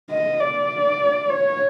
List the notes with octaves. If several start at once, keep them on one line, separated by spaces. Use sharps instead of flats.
D#5
D5
C#5